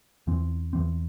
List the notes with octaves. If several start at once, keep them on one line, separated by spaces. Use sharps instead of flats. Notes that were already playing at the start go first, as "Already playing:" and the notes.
E2 E3 C4
E2 E3 C4